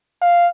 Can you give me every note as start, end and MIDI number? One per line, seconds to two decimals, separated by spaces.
0.22 0.46 77